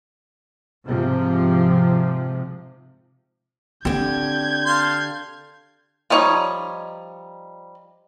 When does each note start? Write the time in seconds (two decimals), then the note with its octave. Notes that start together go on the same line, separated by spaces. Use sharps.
0.84 G#2 C3 F3
3.85 D3 C4 D4 G4 G6 G#6
4.66 F5 A5 C6
6.10 F3 G3 D#4 C#5